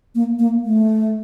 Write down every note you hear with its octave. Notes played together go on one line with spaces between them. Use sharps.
A#3
A#3
A3